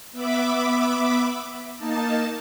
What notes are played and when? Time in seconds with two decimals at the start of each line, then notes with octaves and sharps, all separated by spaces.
0.12 B3 E5 B5 D6
1.77 A#3 D#4 A5